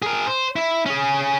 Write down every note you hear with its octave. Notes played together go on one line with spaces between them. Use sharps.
G#4 A#4
C5
E4
C#4 G#4